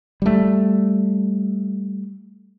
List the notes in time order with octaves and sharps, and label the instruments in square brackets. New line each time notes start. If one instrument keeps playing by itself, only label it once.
[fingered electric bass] G3 A3